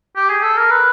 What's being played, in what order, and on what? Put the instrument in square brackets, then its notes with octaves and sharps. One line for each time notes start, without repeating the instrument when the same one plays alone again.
[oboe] G4
G#4
A4
A#4
B4